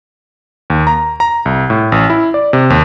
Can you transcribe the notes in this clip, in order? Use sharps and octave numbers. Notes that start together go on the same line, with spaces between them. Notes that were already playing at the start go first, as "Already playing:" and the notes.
D#2
A#5
A#5
C2
A2
A1
E4
D5
C3
D#2